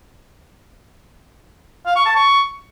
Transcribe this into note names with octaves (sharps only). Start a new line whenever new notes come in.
F5
C#6
A5
C#6